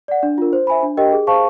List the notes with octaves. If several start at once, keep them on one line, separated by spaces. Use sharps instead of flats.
D5 F#5
D4
F4 A#4
C5
E5 G#5 B5
D4
G4 A#4 D#5 G5
G#4
C5 F5 A5 C#6